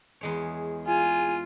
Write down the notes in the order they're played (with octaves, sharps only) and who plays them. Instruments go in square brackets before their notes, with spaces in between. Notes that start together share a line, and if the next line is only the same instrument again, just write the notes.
[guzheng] E2 G#3 C#5
[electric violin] F4 [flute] G#5